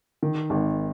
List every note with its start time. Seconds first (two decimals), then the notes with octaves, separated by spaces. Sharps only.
0.23 D#3
0.50 G#1